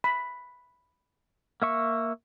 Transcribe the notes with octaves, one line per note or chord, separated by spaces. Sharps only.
B5
A#3 E5 C#6